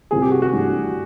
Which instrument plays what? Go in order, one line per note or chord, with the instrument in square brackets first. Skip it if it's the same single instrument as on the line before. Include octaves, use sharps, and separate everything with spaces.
[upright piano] C2 C3 F3 [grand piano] G#4
[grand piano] G4
F#4
F#4
[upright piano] G2 E3 A3 D4